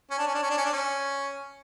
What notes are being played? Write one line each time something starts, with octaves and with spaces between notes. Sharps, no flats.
C#4
D4
C#4
D4
C#4
D4
C#4
D4
C#4